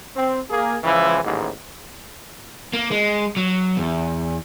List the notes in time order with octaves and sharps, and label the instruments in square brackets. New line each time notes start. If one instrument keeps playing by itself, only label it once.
[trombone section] C4
A#3 G#4
C#2 E3 F3 E4
A1 D#2 G#2
[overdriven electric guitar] A#3
G#3
F#3
E2